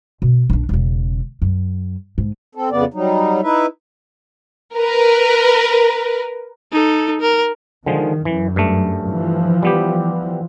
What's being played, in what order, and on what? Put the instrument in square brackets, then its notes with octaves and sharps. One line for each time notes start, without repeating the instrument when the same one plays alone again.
[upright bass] B2
A#1 D4
E1 C#3
F#2
G#2
[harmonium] C4 A4
F2 C#3 B3 D5
F#3 G3 D#4
D#4 E4 B4 E5
[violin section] A#4 B4
[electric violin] D#4 A4
A#4
[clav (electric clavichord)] D3 F3 G#3 [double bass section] D#3
[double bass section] F#2 [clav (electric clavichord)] E3
[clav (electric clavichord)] G2 A3
[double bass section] E3 F3
[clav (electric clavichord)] G3 B3 G4